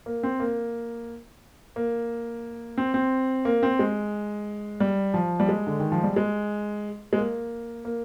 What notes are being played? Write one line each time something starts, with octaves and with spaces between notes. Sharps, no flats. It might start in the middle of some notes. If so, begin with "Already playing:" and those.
A#3
C4
A#3
A#3
C4
C4
A#3
C4
G#3
G3
F3
G3
G#3
D3
D#3
F3
G3
G#3
G#3
A#3
A#3